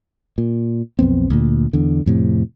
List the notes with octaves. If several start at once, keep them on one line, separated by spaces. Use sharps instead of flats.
A#2
B1 F2 B3 C4
D2 A#2
E2 D3
F2 A2 C3